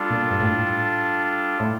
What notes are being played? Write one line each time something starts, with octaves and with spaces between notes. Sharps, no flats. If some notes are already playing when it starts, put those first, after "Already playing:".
Already playing: G3 D4 F4 A4
A#2
G2
A2
A2